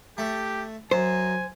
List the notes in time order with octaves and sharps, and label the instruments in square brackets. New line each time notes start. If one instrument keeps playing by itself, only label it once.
[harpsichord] A3 [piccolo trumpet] G4
[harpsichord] F#2 [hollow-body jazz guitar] C5 [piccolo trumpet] G#5